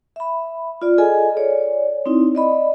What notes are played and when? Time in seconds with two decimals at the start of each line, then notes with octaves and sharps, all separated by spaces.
0.16 E5 B5
0.82 F4 D5
0.98 G#4 A4 D#5 G#5
1.37 C#5 D5
2.06 C4 D#4 E4
2.35 D5 D#5 B5